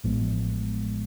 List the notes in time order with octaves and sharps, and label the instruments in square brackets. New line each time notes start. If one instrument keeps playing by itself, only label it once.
[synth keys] A1 A2 F3 G#3 B3